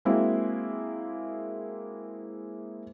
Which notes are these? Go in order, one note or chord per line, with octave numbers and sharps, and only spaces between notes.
G#3 A#3 C4 E4 F#4